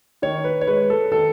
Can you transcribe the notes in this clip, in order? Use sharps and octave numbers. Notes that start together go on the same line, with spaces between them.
D#3 C#5
B4
C#5
G#3 B4
A4
D#3 A4